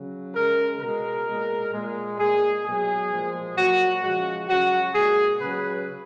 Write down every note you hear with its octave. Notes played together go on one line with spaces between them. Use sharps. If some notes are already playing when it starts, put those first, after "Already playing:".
Already playing: C#3 F#3
C#3 G#3 A#4
B2 G#3 A#4
A#2 G#3
A#2 G#3
A#2 G#3 G#4
B2 F#3 G#4
A#2 F3 G#3
A#2 F#3 F#4
C#3 F3 G#3 F#4
C#3 F#3 F#4
A#2 G#3 G#4
C#3 F#3 B4